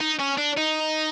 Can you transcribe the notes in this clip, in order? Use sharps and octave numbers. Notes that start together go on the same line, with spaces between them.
D#4
C#4
D4
D#4